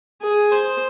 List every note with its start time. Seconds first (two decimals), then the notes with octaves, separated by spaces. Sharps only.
0.22 G#4
0.52 C5